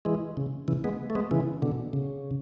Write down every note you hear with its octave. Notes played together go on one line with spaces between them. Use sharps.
E3 G#3
C#3
C#3 E3
G#3 B3
A3
G#3 B3
C#3 E3
B2 D3
C#3